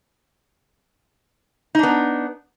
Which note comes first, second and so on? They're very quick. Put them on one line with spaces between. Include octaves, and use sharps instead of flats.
D#4 D4 B3